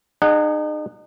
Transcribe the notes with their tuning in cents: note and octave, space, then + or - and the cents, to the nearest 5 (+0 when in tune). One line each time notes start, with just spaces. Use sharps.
D#4 -40 G#4 +0 F#5 +0